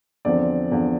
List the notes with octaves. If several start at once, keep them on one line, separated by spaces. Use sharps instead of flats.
E2 D3 F3 C4 D5
E2 D3 F3 C4